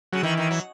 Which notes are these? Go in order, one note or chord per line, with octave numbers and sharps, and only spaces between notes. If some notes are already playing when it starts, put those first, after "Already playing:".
C#3 F#3
D#3 E3
D#3
F#3